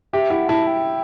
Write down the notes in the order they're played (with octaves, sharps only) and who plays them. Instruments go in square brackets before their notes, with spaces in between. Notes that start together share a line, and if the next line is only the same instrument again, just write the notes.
[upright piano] G4 [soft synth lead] E5
[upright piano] E4 [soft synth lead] F#5
[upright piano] E4 [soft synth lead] A5
[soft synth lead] G5